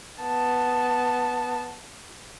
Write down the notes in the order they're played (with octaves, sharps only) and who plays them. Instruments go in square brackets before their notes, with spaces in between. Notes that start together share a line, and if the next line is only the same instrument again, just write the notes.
[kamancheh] B3 A5